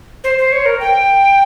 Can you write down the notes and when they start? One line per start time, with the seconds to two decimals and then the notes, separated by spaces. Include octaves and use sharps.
0.24 C5
0.38 C5
0.52 C#5
0.66 A#4
0.80 G5